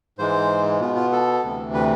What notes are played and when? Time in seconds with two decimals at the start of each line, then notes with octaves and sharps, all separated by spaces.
0.19 G#2 E3 G#3 C5
0.80 B2 B3 F4
0.96 F4
1.12 A4
1.43 D2 C3 E3
1.74 B4